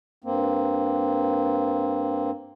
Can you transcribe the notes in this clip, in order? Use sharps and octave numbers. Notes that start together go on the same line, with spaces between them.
G2 A#3 C4